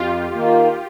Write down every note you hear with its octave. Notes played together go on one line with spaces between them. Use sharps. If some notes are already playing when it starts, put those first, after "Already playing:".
Already playing: F2 F4 G4
D#3 A#3 F4